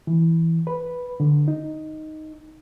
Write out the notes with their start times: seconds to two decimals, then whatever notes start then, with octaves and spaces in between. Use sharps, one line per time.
0.07 E3
0.67 B4
1.20 D3
1.48 D#4